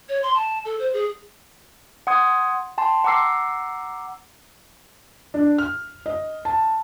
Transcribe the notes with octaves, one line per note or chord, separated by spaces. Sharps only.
C#5
C6
A5
A4
C5
G#4
F#5 C6 D#6 G#6
G5 A5 C6
F#5 A#5 D6 E6 C7
D4
F6
D#5
A5